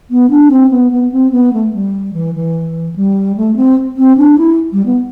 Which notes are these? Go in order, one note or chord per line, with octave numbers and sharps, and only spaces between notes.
B3
D4
C4
B3
B3
C4
B3
A3
G3
E3
E3
G3
A3
C4
C4
D4
E4
G3
B3